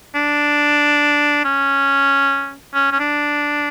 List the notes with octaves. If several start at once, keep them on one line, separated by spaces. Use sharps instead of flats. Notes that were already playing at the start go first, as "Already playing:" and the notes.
D4
C#4
C#4
C#4
D4